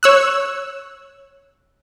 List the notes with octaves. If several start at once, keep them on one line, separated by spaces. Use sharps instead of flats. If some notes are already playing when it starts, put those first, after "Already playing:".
C#5 E6 F#6